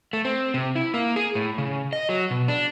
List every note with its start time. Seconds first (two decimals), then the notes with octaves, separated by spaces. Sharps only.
0.13 A3
0.25 C4
0.54 C3
0.76 E4
0.94 A#3
1.16 G#4
1.35 A2
1.58 C#3
1.93 D#5
2.09 F#3
2.31 B2
2.48 D4